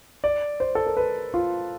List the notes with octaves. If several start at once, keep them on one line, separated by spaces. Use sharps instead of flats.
D5
C5
A4
A#4
B4
F4